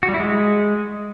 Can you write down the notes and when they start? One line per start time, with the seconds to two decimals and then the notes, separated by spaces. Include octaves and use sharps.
0.03 F#4
0.08 G3
0.14 E4
0.20 G#3